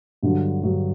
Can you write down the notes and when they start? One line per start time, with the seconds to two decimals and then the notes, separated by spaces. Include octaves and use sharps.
0.23 G2 D3 F#3
0.63 G2 D3 F#3